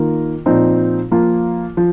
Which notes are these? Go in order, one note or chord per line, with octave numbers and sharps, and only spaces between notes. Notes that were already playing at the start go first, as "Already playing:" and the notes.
Already playing: D#3 A#3 F4 A#4
A#2 F3 C4 D#4
F3 A#3 F4
F3